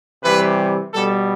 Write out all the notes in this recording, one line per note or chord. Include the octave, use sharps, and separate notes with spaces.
C3 E3 G3 B4
B2 G3 A4